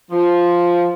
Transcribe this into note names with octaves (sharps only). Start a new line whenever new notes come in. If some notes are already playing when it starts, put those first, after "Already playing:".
F3